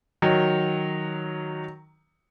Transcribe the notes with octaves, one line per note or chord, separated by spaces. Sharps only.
D#3 F#3